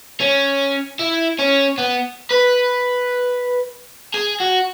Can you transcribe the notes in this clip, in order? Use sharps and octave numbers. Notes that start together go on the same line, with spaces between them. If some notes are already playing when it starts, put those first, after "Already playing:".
C#4
E4
C#4
B3
B4
G#4
F#4